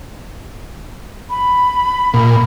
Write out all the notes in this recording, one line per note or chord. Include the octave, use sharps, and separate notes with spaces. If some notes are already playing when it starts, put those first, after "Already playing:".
B5
A#2